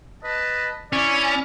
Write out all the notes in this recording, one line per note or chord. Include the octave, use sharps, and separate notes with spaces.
B4 D#5 A5
C#4 E4 D5